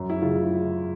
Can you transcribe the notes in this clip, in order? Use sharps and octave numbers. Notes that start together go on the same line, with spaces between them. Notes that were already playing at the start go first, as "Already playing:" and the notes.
Already playing: F#2
E4
C#3 F4